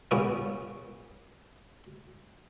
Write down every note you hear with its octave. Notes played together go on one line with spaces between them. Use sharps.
C#2 G2 A#2 A#3 B3 C#4